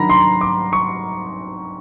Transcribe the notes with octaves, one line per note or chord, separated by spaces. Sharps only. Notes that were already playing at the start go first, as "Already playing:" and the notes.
Already playing: D#3 F#3 D4 A#5 B5
C6
D6
C#6